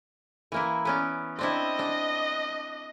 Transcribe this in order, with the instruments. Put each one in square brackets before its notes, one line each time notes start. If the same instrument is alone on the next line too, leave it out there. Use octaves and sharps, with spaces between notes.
[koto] E3 A#3 E4
B3 C#4 D5
[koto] C4 D4 E4 [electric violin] D#5
[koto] D4